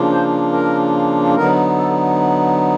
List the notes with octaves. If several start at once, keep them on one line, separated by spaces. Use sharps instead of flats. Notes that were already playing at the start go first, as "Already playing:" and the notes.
Already playing: C#3 F3 A#3 D4 F4
C5
A#4
D3 F#3 B3 D#4 A#4
A4